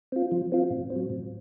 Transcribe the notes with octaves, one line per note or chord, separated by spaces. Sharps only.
C4 F4
F3
C4 F4
A2
C4
F#3
A2